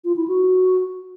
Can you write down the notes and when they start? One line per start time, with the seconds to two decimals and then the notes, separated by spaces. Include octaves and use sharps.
0.05 F4
0.16 E4
0.28 F#4